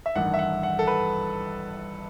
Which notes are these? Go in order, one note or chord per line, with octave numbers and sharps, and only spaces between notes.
E5
A1 G2 D#3 F#5
E5
F#5
F#5
A4
B4